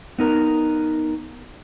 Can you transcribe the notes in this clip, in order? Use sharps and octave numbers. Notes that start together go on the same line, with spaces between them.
B3 D#4 A#4